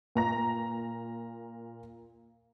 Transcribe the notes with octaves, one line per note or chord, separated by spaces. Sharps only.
A#2 A#5 A#6